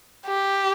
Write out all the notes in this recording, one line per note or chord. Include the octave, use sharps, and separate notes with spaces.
G4